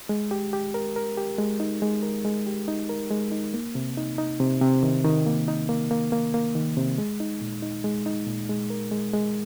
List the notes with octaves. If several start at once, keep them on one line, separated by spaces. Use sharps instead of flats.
G#3
G4
G4
A#4
A#4
G4
G#3
D#4
G#3
A#4
G#3
G4
D#4
A#4
G#3
D#4
A#3
C3
D#4
D#4
C3
C3
D#3
D#3
A#3
D#4
A#3
A#3
A#3
A#3
D#3
C3
G#3
D#4
A#2
D#4
G#3
D#4
A#2
G#3
A#4
G#3
G#3